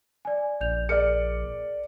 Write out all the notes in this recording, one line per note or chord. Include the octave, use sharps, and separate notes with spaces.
D5 G#5
A#1 D5 G6 F7
G#4 A#4 D5 F6 C#7